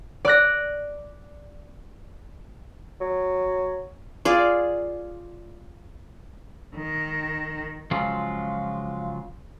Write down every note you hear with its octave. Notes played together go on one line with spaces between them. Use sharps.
D5 D6 F#6 A#6
F#3
F4 G#4 D5
D#3
C#3 F3 F#3 G#3 F4